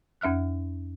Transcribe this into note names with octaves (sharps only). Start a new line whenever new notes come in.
F2 C#4 E5 F6 F#6